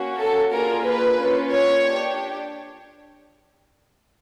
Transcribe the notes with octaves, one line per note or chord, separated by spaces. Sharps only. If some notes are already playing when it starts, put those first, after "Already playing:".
Already playing: A#3 C#4 F#4
A4
A#3 D4 F4 G#4 A#4
B4
A#3 C#4 F4
C#5
D4 G4